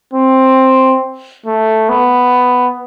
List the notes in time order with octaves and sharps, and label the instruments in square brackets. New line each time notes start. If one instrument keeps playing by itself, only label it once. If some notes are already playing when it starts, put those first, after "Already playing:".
[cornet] C4
A3
B3